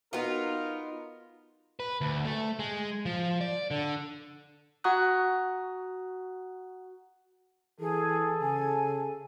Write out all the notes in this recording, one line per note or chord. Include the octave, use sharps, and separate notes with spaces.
B3 D#4 F4 F#4 A#4 B4
B4
D2
A3
G#3
F3
D5
D3
F#4 F#5 A#5 C#6 D#6 F#6
E3 G#4 A4
C#3 G#5